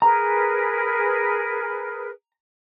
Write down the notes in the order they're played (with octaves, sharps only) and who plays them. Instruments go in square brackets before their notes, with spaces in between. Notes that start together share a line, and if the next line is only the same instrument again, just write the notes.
[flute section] G#4 A#4 B4 [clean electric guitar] A#5